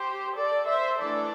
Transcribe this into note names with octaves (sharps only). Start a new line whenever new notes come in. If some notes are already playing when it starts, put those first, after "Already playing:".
Already playing: G4 C5
A4 D5
C5 E5
E3 A3 D4 A4 D5